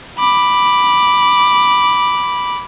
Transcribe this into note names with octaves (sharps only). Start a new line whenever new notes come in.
B5 D6